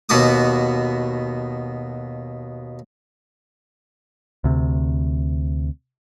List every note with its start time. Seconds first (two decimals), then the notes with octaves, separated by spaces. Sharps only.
0.09 D#2 B2 B3 F#4 D6 D#6
4.44 D2 C3